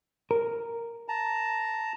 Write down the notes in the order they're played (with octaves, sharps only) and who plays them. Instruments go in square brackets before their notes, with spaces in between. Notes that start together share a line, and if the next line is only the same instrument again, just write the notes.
[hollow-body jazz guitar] A#4
[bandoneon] A5 A#5